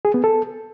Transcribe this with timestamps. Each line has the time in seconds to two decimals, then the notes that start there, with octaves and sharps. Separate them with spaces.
0.05 G#4
0.14 B3
0.24 A4